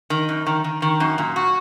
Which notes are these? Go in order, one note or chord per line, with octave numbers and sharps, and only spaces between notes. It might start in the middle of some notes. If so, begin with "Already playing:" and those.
D#3
F#2
D#3
D#3
D#3
F#2
A#2
F#4